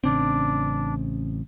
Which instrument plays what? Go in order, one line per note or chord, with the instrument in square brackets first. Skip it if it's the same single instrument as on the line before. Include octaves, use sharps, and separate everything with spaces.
[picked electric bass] A1 C#3 C4 [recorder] D4